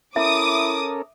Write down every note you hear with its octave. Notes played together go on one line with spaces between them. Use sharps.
C#4 E4 A4 A#4 E5 D6 D#6